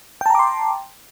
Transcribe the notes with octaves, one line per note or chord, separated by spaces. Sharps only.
G5 A5 A#5 C6 D6